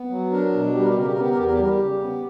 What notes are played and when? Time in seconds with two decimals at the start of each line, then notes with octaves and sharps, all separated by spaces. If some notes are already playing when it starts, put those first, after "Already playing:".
Already playing: B3
0.09 F#3
0.31 D4 A#4
0.53 B2
0.74 G3 G4
0.81 A#4
0.89 G4
0.94 C#3 A#4
1.05 G4
1.13 A#4
1.16 B3
1.21 G4
1.30 A#4
1.37 E2 G4
1.45 A#4
1.53 G4
1.58 G3 A#4
1.69 G4
1.79 C#3
2.00 B3